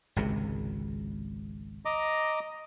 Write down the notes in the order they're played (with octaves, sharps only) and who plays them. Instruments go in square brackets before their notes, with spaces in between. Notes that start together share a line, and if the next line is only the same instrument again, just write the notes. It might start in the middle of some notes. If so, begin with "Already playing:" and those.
[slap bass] G#1 C#2 C3
[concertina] D#5 A#5 D6